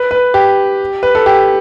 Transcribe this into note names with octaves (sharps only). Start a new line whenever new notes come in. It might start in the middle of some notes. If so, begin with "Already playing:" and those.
Already playing: B4
B4
G4
B4
A4
G4